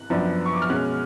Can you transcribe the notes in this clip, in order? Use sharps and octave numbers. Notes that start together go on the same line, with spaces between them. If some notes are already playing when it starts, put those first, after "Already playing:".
Already playing: F#6
F#2 F3 B3 D4
C#6
D6
F6
B2 G#3 C#4 F#6